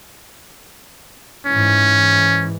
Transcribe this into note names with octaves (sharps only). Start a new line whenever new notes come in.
G#2 E3 C#4